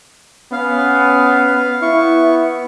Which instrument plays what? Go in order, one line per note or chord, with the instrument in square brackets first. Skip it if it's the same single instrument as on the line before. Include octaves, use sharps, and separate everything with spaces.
[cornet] B3 [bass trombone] C#4 [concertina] F5
[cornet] B3 [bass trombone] E4 [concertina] C#6